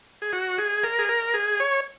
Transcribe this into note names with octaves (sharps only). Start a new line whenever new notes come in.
G#4
F#4
G#4
A#4
G#4
A#4
G#4
C#5